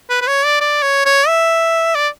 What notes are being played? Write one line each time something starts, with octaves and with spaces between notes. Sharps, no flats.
B4
B4
C#5
D5
D5
C#5
C#5
E5
D5